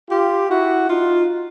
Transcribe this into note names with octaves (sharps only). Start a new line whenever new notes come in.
F4 G4
E4 F#4
D#4 F4